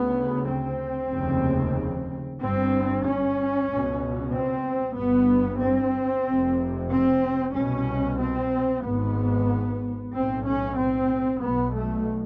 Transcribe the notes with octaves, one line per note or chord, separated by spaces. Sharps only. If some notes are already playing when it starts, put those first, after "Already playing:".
Already playing: D2 C#3 B3
C4
F1 D#2 C#3
G1 G2 C4
C#4
C#2 B2
C4
G1 G2 B3
C4
F1 F2 C3
C4
C2 B2 C#4
C4
G#1 G#2 B3
B1 A2 C4
C#4
C4
B1 B2 B3
A3